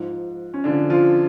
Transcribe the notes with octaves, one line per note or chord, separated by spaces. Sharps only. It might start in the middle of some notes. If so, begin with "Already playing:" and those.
Already playing: G#2 F3
C#4
G#2 D3 F3 D4
F3 F4